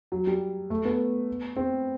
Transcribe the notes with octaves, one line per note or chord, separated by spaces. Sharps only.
F#3
G3
A3
B3
C4